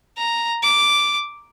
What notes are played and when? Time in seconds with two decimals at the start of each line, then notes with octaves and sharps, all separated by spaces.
0.17 A#5
0.63 D6